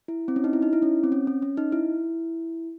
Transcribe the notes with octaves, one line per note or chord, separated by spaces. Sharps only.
E4
C4
C#4
D#4
E4
D#4
E4
C#4
C4
C#4
C#4
C#4
D#4
E4